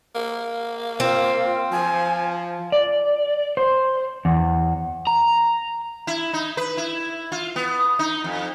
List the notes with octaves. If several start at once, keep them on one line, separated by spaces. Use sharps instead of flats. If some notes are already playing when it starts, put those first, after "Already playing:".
A#3
C4 F4
F3 G#5
D5
C5
E2
A#5
E4
D#4
B4
E4
F4
B3
D#4
F2